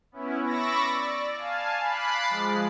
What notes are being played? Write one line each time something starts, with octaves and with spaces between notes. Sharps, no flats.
B3 C#4 E4
B5 C#6 D6 E6 A6 A#6
D5
F5 G#5 A5
B5 D6 F#6 A6 C7
F3 G#3